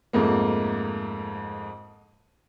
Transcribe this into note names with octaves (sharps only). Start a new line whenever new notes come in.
F2 G#2 A3 A#3